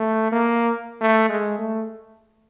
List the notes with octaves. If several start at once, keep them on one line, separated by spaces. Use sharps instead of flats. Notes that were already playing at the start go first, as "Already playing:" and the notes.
Already playing: A3
A#3
A3
G#3
A3